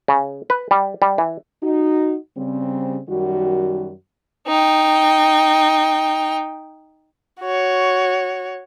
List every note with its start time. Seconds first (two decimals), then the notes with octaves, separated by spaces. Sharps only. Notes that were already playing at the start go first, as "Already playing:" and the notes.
0.08 C#3
0.50 B4
0.71 G3
1.02 G3
1.18 E3
1.63 D#4 F#4
2.38 C#3 G3 C4
3.09 F#2 D#3 G3 F#4
4.47 D#4 G5
7.41 F#4 C#5